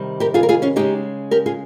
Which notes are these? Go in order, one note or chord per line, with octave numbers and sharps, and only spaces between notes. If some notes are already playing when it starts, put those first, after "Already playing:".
Already playing: C3 D#3 G3
G4 A#4
F4 G#4
A#4
F4 G#4
C#4 F4
C#3 G#3 D#4 G4
G4 A#4
F4 G#4